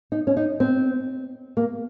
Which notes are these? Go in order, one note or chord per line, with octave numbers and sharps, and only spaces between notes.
D#4
C#4
D#4
C4
A#3